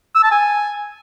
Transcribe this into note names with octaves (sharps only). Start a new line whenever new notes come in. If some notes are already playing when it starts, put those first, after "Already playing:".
E6
A5
G#5